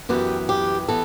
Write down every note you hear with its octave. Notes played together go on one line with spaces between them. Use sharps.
F#2 E3 B3 G4
G4
E3 B3 A4